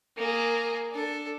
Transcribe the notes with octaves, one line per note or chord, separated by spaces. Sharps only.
A#3 G#4
D4 A4